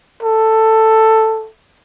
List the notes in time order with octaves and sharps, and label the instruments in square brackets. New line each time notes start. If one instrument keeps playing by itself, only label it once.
[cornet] A4